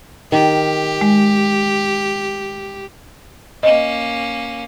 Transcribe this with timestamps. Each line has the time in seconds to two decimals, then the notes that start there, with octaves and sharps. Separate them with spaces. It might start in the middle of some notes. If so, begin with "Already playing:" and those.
0.32 D#3 G4
1.01 G#3
3.63 A#3 C#4 D#5